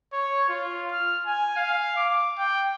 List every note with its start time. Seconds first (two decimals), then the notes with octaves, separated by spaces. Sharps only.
0.13 C#5
0.49 F4
0.92 F6
1.26 G#5
1.57 F5
1.96 D6
2.38 G5